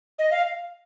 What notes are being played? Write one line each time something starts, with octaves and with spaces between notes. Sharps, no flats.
D#5
F5